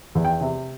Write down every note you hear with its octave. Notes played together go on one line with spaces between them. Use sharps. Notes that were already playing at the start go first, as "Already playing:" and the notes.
E2
G5
C3